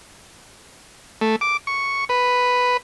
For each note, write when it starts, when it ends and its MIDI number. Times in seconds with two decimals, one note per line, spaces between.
1.21 1.36 57
1.41 1.57 86
1.67 2.05 85
2.09 2.77 71